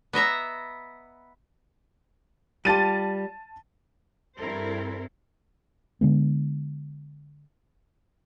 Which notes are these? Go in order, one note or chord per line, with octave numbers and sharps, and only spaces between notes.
B3 D#5 E5 A#5
G3 F4 G4 A5 A6 D#7
G2 C4 E4 A4 A#4 C5
D3 G#3 B3